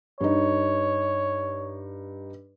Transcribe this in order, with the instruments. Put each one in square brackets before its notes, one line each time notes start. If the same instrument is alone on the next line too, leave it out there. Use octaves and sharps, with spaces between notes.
[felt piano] G2 D#4 [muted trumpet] C#5